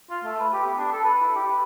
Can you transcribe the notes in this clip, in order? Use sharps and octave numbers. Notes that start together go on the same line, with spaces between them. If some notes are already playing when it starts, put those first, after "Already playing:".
F4
A3
B4
G4
B3
D4
A4
B4
E4
G4
B4